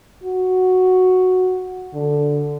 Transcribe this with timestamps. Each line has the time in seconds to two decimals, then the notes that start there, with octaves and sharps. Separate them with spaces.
0.24 F#4
1.94 D3